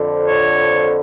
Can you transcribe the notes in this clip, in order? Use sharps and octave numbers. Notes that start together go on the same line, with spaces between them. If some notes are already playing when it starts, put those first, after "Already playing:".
Already playing: F2 D3
C#5